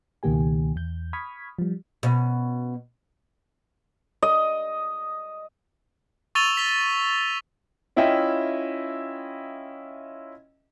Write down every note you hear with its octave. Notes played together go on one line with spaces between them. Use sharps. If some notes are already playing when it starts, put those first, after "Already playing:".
C#2 B2 D#3 A#3 G4 G#5
E2 G6
B5 C#6 D#6 F6 G#6 B6
F3 G3
B2 C#4
D#5
C#6 E6 A6 D#7 F7 G7
B6 G7
C#4 E4 F4 D#5 E5 G5